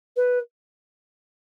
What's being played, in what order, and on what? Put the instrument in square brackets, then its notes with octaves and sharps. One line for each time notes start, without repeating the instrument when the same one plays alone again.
[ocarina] B4